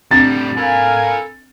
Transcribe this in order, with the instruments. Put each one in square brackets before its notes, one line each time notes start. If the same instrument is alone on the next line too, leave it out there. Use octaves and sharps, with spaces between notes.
[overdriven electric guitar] A2 G3 [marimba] C4 D4 [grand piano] A6
[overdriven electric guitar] A4 B5 [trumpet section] A#4 F5 G#5